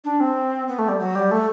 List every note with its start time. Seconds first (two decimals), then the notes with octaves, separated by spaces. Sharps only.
0.04 D4
0.20 C4
0.68 B3
0.79 A3
0.88 G3
0.99 F#3
1.15 G3
1.31 A3